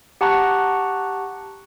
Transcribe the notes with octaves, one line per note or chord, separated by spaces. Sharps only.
G4 F#5 A5 A#5 C#6 F#6